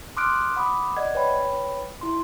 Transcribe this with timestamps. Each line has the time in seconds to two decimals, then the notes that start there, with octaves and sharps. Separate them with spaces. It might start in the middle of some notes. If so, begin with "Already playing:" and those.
0.17 C6 D6 D#6 F6 F#6 D7
0.56 F#5 B5 D6 D#6
0.97 D5 D#5 F#5 G#6
1.15 B4 C#5 G5 B5
2.01 E4 C6